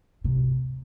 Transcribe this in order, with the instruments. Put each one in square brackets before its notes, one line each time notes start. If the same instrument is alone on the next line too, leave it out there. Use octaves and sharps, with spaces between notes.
[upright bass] C3